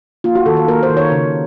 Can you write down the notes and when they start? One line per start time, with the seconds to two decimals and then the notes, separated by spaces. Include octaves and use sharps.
0.24 A#3 F4
0.35 F#4
0.46 D#3 A4
0.57 A4
0.68 A#3 A#4
0.83 C5
0.90 D#3
0.97 C#5
1.12 C#3